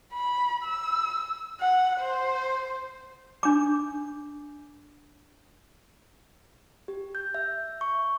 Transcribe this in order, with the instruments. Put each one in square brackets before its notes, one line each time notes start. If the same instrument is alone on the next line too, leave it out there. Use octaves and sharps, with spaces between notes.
[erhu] B5
E6
F#5
C5
[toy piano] D4 D6
[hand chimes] G4
G6
E5
C#6